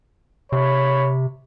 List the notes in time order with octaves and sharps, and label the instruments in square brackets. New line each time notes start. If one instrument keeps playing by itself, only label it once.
[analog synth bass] C3 [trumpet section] C#5 B5